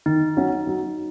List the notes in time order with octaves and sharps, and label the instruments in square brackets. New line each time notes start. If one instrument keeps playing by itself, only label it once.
[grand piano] D#3 [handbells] D#4
[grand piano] F#3 C#4 F#4
F#3